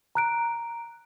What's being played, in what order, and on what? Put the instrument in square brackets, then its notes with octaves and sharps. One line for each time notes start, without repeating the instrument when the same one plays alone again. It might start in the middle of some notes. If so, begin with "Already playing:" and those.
[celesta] A#5 F#6 D7